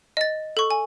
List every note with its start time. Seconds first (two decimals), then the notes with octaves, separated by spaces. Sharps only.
0.17 D#5 A6
0.57 A4 C#6
0.71 G#5